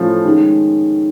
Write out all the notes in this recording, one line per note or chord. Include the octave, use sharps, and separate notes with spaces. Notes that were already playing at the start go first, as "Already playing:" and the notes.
Already playing: A2 F3 A3 C#4
D#3 G#3 C#4